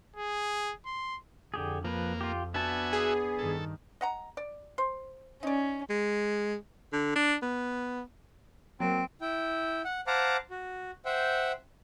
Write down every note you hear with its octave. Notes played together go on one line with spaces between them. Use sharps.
G#4
C6
F2 D3 G4 G#4
F3 A#3 B4
F4 G4
B3 D4 F#4 E5 G#5 A5
G#4
G2 D#3 A4
D#5 F#5 A#5
D5
C5
C#4 D#4 D5
G#3
D3
D4
B3
F#3 A#3 C4
E4 G5
F#5
C5 F5 F#5 A5 A#5 D6
F#4
C5 E5 F#5 G5